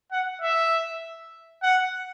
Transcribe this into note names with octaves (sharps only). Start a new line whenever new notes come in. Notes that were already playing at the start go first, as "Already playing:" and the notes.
F#5
E5
F#5